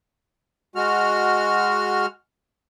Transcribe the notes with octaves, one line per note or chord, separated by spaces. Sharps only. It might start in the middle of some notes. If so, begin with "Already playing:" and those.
G#3 F#4 F6